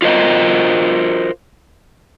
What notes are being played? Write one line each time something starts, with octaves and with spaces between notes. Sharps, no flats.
F4 F#4 A#4 C5 D#5